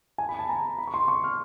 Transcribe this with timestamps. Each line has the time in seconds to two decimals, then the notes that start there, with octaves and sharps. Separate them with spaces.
0.18 G#5
0.29 B5
0.39 A5
0.49 A#5
0.78 B5
0.87 C#6
0.94 C6
1.08 C#6
1.24 F6